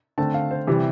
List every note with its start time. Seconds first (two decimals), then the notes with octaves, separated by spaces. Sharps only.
0.18 D3 A3 C4 A5
0.34 F5
0.51 C5
0.67 C3 E3 G3